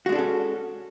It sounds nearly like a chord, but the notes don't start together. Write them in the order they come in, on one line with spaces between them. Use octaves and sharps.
F#4 G#3 D4 A4 C#4